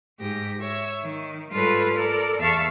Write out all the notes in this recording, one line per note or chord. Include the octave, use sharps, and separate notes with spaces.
G#2 G4 A#6
C#5 E5
D#3
G#2 G3 F4 A4 B4 C#5
A4 A#4 D5
E2 E5 F5 A5 C#6